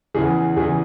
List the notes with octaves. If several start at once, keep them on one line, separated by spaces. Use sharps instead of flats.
E2 C#3 E3 G#4
E2 C#3 E3 G#4